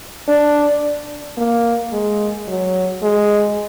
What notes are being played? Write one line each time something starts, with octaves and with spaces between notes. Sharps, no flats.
D4
A#3
G#3
F#3
G#3